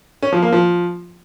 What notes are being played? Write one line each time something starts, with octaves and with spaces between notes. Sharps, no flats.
C#4
F3
A#3
F3